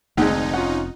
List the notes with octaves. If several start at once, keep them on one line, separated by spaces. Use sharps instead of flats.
F1 D2 B2 G#3 C4 D#4
C#4 F4 F#5